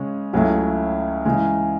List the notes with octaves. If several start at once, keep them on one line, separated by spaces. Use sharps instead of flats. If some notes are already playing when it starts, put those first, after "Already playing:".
Already playing: C#3 G#3 C#4
C#2 C#3 F#3 A3 E4
C#3 E3 G#3